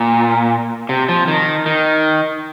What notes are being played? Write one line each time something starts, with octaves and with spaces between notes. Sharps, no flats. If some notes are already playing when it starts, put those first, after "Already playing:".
Already playing: A#2
C3
F3
D#3
D#3